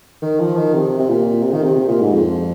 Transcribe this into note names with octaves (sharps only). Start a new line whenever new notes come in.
D#3
F3
D#3
C3
C3
A#2
C3
D#3
C3
C3
A#2
G#2
F2